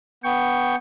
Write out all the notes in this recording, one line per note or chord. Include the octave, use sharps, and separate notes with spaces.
B3 G5 C#6